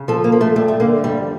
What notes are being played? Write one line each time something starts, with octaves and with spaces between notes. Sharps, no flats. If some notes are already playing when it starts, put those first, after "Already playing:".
Already playing: C#3
F3 A4
A#3
F3
A3
G2 A3
A3
D3 A#3
F2 G3